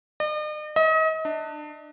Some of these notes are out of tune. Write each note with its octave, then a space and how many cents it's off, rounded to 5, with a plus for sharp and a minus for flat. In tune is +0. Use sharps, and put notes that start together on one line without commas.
D#5 -45
D#5 +35
D4 +30